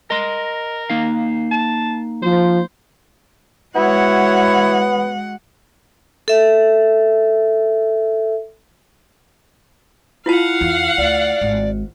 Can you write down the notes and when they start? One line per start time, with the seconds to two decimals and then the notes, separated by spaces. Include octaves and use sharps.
0.11 A#4 D#5 C6
0.90 A#3 D#4 F5
1.51 A5
2.23 F3 C5
3.76 G#3 B3 E4 F#4 C#5 F#5
6.28 A4 E5
10.26 E4 F4 F5 F#5 A5
10.61 E2
10.98 D2 D5
11.41 G#1